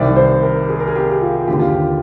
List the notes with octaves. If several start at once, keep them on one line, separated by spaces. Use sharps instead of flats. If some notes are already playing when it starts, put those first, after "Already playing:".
Already playing: C2 C3 D#3 D5
C5
A#4
G#4
A#4
G#4
G4
G4
F4
D#2 D3 G4
F4
G4